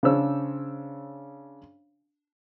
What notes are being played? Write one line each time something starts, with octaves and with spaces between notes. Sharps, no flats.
C#3 D4 C5 C#5 E6